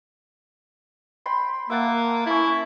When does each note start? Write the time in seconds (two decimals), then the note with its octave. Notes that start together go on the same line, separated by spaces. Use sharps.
1.26 G5 B5 C6
1.70 A#3 E5 F#5 A5
2.26 C#4 E4 A5